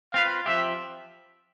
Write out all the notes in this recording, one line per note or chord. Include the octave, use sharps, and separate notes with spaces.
C4 F4 B4 F5
F3 C4 G4 E5